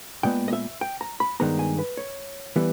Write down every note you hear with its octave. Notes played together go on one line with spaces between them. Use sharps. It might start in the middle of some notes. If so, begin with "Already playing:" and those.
A#2 G#3 B3 G5
D#5
E5
G5
A#5
B5
G2 D#3 G#3 B3 A#5
G#5
B4
C#5
E3 G3 B3